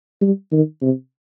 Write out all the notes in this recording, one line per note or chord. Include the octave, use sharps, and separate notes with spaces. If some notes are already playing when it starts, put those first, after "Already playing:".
G3
D#3
C3